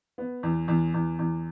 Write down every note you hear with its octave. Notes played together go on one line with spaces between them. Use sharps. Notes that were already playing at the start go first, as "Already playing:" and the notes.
B3
E2
E2
E2
E2